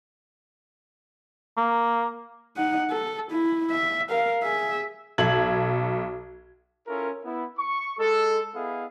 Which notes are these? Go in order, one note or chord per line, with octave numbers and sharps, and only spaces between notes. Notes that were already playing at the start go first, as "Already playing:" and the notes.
A#3
D#4 F#5
A4
E4
E5
A#4 F5
G#4 E5
B1 A4 G#6 F#7
C#4 E4 F4 A4 A#4
B3 E4
C#6
G#3 A4
B3 E4 G#4 D#5 F5